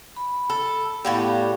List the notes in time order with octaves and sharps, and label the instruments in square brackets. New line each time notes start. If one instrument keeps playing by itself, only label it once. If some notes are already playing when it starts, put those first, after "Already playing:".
[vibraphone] B5
[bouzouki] A4
[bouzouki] A2 F#4 G4 [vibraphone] B3 D5 F5